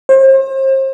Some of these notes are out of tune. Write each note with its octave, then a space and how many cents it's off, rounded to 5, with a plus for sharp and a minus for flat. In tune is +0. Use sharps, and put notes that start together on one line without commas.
C5 +35